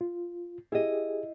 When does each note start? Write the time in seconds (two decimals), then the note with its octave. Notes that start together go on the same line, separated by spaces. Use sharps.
0.01 F4
0.72 E4 G4 G#4 D#5